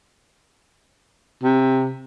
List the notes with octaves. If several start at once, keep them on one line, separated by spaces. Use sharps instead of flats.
C3